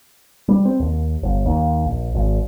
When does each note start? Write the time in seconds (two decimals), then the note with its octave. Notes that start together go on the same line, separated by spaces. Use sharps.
0.48 G3
0.65 C4
0.80 D#2
1.23 G1
1.46 D#2
1.85 A#1
2.14 G#1